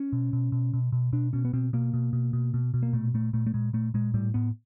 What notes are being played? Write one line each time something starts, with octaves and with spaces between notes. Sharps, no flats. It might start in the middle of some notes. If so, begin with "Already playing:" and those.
Already playing: C#4
B2
B2
B2
B2
B2
B2 D4
B2 C#4
B3
B2 C4
B2 A#3
B2
B2
B2
B2
B2
A#3
A#2 A3
A#2 A3
A#2 A3
A3
A#2 G#3
A#2 A3
A#2 G#3
A2 G3
A2 B3